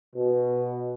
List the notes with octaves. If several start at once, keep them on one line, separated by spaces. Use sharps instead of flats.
B2